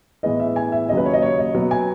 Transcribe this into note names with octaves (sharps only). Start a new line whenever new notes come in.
A2 E3 G#3 B3 D#5
E5
G#5
E5
D#2 C#3 F#3 D#5
B4
C#5
D#5
C#5
D#5
B2 F#3 B3
G#5